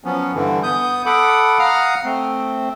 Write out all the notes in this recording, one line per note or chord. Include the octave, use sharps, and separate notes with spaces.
F3 F#3 B3 C#4
G2 D3 E3
B3 D#6 G6
A4 F#5 B5 D6 D#6
F5 F#5 A#5 D#6 F6
A3 C4